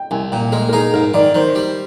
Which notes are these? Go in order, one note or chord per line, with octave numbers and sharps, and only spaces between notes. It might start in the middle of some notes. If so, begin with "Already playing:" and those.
Already playing: G5
C2 G#5
A#2 G5
G#3 A#4
A#4
D#4 G#4
G#2 A#4
D#3 D5
D#3 C5
G3